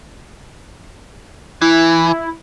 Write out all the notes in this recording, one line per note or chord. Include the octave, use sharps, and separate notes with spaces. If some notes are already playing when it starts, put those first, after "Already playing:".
E3 E4